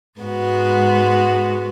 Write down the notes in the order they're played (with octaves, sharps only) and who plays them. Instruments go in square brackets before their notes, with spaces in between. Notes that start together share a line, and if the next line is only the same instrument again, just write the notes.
[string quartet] G#2 G#3 B3 F#4